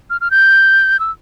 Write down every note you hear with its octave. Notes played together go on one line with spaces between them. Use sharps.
F6
F6
G6
E6